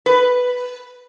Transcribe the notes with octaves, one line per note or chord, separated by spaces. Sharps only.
B4